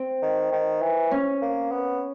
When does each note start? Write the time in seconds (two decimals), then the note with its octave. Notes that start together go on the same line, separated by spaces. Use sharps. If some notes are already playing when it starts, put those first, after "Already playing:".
Already playing: C4
0.22 D#3
0.52 D#3
0.82 E3
1.11 C#4
1.42 A#3
1.72 B3